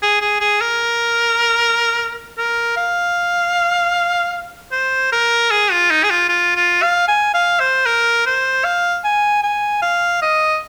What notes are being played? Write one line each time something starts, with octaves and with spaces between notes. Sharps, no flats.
G#4
G#4
G#4
A#4
A#4
F5
C5
A#4
G#4
F4
D#4
G#4
F4
F4
F4
F5
G#5
F5
C5
A#4
C5
F5
G#5
G#5
F5
D#5